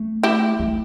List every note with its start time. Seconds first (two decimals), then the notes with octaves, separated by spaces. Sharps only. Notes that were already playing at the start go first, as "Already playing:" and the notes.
Already playing: A3
0.23 E4 G4
0.60 A3